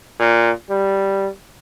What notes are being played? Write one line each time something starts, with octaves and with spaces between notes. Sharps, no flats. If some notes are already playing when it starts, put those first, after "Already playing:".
A#2
G3